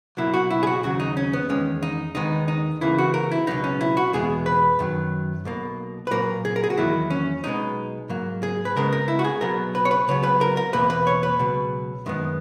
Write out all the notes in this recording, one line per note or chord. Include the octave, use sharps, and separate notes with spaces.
B1 B2 F#3 A#3 E4
F#4
E4
G#4
F#4
D#2 C#3 F#3 F#4
D#4
C#4
B3
E2 D#3 G#3 C#4
D#4
D#2 D#3 G#3 B3 D#4
D#4
C#2 C#3 E3 A#3 E4
F#4
A#4
E4
C#2 B2 F#3 B3 D#4
C#4
E4
F#4
E2 B2 G#3 B3 G#4
B4
F#2 D#3 F#3
B1 B2 A#3
B4
A#2 F#3 A#3 A#4
G#4
A#4
G#4
F#4
E2 D#3 F#3 A#3 E4
C#4
B1 B2 G#3 B3 D#4
G#2 F#3 A#3
G#4
B4
C#2 C#3 G#3 B3 A#4
A#4
E4
F#4
G#4
B1 B2 F#3 B3 A#4
B4
C#5
B4
C#2 C#3 F#3 B3 C#5
B4
A#4
A#4
E2 B2 A#3 B4
B4
C#5
B4
C#2 B2 F#3
F#2 D#3 G#3 B3